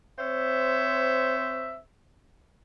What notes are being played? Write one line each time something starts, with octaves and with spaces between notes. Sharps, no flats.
C4 C5 C#5 E5